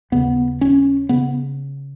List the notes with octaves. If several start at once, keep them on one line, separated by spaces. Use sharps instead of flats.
D#2 C#3 B3
C#4
C#3 B3